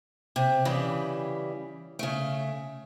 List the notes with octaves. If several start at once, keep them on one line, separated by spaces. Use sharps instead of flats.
C3
C#3 E3 G3
C#3 A3